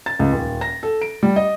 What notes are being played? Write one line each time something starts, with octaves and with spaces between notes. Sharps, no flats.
A6
C#2
D#1
A#6
A4
D7
G3
D#5